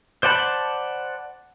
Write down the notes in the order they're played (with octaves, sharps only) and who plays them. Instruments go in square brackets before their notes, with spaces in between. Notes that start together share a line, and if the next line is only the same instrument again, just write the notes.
[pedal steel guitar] C5 D5 F#5 A5 B5